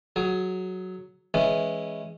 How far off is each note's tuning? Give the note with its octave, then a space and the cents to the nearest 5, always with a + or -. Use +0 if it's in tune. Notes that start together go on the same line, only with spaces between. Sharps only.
F#3 +0 G#4 +20
E3 +0 G#3 +0 C#4 -15